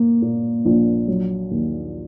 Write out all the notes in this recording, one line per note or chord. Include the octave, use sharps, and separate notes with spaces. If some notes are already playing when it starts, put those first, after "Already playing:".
Already playing: A#3
A#2
A#1
F#3
D#2